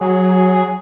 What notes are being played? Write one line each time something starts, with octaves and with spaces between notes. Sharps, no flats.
F#3 G#4